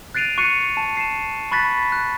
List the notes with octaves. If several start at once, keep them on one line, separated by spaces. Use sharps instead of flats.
F#6 A6 C7 D7 D#7 F7
C#6 F#6 C7 C#7 D#7
A5
C7 E7
B5 C#6 F#6 A6 B6
F#6